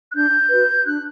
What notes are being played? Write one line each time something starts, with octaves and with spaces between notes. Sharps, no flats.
F#6
D4 G6
F#4 B4
D4 F#6